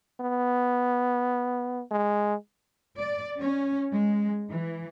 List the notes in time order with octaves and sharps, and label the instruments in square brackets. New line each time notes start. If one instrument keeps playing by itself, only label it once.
[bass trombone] B3
G#3
[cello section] D5
C#4
G#3
E3